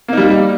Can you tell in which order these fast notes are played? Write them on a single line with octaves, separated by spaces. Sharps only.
A#3 D#4 G3